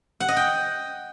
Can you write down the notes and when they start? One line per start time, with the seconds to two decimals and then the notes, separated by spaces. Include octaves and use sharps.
0.20 F#5
0.28 D#5
0.36 G5